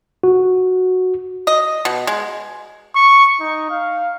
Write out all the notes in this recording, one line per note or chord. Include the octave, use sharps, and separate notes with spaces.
F#4
D#5
B2
G#3
C#6
D#4
F5